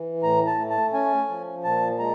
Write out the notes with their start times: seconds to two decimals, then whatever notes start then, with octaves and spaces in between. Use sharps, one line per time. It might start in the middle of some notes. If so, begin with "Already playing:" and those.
Already playing: E3
0.23 A2 A#5
0.47 A5
0.58 A3
0.70 A5
0.93 C#4 G#5
1.29 F3
1.64 A#2 A5
1.99 G#3 A#5